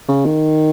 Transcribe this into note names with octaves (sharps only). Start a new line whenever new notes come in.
C#3
D#3